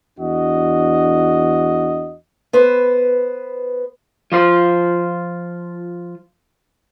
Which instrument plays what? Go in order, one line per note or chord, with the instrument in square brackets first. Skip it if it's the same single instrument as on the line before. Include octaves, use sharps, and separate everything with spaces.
[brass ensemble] E2 D4 F#4 D#5
[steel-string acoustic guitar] B3 B4 C5
[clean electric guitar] F3 F4 C5